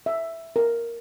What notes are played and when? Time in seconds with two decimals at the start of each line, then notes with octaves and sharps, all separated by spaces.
0.06 E5
0.56 A#4